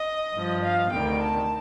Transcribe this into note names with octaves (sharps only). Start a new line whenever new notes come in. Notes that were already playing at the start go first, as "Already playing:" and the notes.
Already playing: D#5
G2 F3
F5
D2 C3 D#3 G3 G5
A5